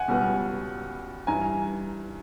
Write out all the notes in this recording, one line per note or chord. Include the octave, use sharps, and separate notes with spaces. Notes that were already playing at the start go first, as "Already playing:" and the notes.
Already playing: F#5 G#5
C#2 B2 G3 B3
G2 E3 G3 G#5 A#5